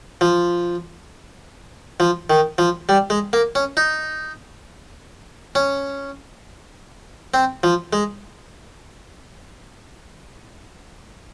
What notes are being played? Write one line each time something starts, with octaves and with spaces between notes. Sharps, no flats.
F3
F3
D#3
F3
G3
G#3
A#3
C#4
D#4
C#4
C4
F3
G#3